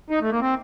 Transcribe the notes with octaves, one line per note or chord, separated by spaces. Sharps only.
D#4
A3
A#3
C4